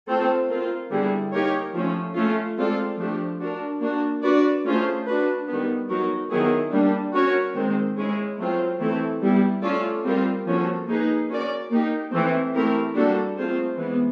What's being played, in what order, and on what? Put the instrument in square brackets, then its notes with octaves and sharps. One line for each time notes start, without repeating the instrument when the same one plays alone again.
[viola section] A3 C4 F4 A4
C4 F4 A#4
D3 G3 B3 E4 G#4
A#3 D#4 G4 A#4 C#5
F3 A3 C#4
A3 C#4 F4
G#3 C4 F4 A4 D5
F3 A3 D4 G4
D4 F#4 A#4
A#3 D4 F#4
D4 F#4 B4 D5
A3 C#4 F4 G#4 C5
D4 F#4 B4
D#3 G3 B3
F#3 B3 D#4 F#4 A#4
D#3 F#3 B3 E4 G#4
G3 A#3 D4
C#4 F#4 A#4 C#5
D#3 G#3 C4
G#3 C#4 E4 G#4
F#3 A3 C4 F4
E3 A3 C4 E4 A4
G3 B3 E4
A3 C#4 F4 A4 D5
G3 C4 F4 A#4
F3 A#3 C#4 F#4 A4
A#3 D#4 G#4 B4
C#4 F#4 A#4 D5
A#3 D#4 G4
E3 A3 C4
A3 C4 E4 G4 A#4
G3 A#3 D4 F#4 A4
A3 C4 F4 G#4 C5
E3 G#3 B3